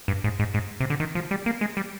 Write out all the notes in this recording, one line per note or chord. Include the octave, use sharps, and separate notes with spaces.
G2
G#2
G#2
G#2
C3
D3
D#3
F3
G3
A#3
G#3
G3